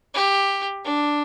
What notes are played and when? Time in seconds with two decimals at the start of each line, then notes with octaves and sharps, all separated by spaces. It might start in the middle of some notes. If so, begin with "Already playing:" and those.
0.14 G4
0.85 D4